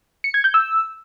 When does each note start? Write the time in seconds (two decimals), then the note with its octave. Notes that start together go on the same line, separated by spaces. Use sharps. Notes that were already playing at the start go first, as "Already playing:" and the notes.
0.24 C#7
0.34 G#6
0.44 G6
0.54 E6